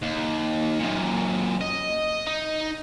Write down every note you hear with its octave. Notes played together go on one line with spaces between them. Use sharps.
D#2
F#2 A#2
D#5
D#4